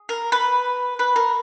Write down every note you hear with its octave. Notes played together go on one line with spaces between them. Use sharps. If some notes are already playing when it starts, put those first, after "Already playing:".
Already playing: G#4
A#4
B4
B4
A#4